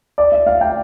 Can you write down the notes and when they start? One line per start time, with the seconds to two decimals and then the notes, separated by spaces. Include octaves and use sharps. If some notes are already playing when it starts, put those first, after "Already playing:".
0.18 D5
0.32 E5
0.47 F5
0.61 G5